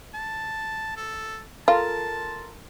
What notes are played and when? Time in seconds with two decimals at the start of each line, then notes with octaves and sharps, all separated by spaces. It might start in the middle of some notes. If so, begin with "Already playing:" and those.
0.14 A5
0.97 A4
1.68 F4 A4 A#4 A5 C6